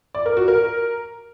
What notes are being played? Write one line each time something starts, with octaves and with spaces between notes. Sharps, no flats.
D5
A#4
F#4
A#4